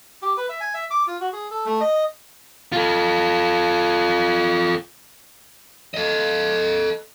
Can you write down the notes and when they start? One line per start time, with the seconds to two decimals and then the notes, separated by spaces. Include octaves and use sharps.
0.22 G4
0.37 B4
0.49 E5
0.60 G#5
0.74 E5
0.91 D6
1.07 F4
1.20 F#4
1.33 G#4
1.51 A4
1.66 A3
1.81 D#5
2.72 F4 A4
5.94 A4 D#5